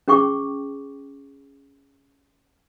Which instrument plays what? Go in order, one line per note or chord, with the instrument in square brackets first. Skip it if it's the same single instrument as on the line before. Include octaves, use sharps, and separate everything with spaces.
[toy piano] C#4 G#4 G5 C#6 D6